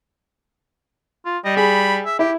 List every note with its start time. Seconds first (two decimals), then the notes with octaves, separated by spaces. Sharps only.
1.26 F4
1.45 G3 D#5
1.57 G#4 B5
2.06 E5
2.19 E4 G4